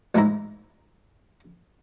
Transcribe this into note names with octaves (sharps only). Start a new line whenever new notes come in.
A1 G#2 G#3 E4 A#5